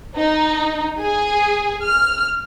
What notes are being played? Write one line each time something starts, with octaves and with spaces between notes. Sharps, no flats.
D#4
G#4
F6